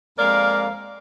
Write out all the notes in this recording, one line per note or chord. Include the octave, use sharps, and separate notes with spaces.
F2 G#3 A#3 A#4 D5 F5